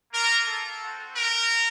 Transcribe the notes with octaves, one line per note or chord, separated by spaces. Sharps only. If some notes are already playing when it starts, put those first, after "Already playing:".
A#3 F4 A#4
A4
C4 F#4
A#4